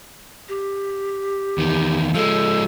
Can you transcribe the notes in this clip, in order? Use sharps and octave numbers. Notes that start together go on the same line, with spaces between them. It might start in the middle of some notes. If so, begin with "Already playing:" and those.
G4
E2 D#3
F3 G#3 A4